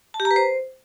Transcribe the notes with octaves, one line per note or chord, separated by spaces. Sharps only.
A5
G4
A#5
B4
C5